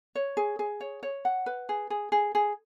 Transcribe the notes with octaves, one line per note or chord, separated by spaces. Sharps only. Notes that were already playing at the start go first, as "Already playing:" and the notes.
C#5
G#4
G#4
C#5
C#5
F#5
B4
G#4
G#4
G#4
G#4